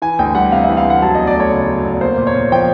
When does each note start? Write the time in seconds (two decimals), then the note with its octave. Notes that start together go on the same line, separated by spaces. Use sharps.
0.02 E3 G#5
0.19 D2 G5
0.35 G3 F#5
0.52 C3 F5
0.64 E5
0.69 E3
0.77 F5
0.85 D2
0.90 F#5
1.02 F#3 A5
1.15 E2 D#5
1.27 D5
1.35 A3
1.40 C#5
1.52 C#3
1.68 F#3
1.85 E2
2.01 A#3 C5
2.18 A#2
2.27 C#5
2.35 A#2
2.52 F3 G5